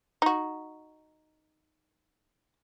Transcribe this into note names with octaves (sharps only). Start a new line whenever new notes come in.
D#4 F#4